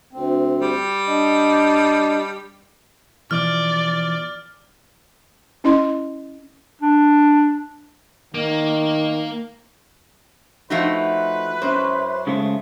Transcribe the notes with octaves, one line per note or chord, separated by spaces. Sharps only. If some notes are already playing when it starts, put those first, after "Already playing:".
D2 C4
G3
D4 D#5
B2 E3 F3 D5 F6
C#4 E4 D#5 C6
D4
D#3 A#3
F3 A3 D#4 F#4 B4 E5
F#2 C#4 E4 C5
C#3 G#3 A3